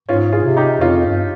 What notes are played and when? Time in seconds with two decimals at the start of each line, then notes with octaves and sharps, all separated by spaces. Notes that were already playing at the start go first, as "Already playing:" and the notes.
0.09 G#2 C#4 F4
0.32 F4 G#4
0.44 C3
0.57 D#4 G4
0.80 F2 C#4 F4
1.05 G2